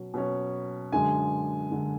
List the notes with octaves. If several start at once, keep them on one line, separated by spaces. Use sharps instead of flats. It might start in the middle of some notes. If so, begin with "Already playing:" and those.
Already playing: B2 F#3 C#4
B2 F#3 C#4
F#2 D3 G#3 G#5
F#2 D3 G#3